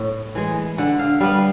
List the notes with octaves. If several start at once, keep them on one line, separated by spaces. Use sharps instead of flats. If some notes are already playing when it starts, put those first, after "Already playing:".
Already playing: A2
E3 G#3
D3 F#5
F5
G3 B3 F5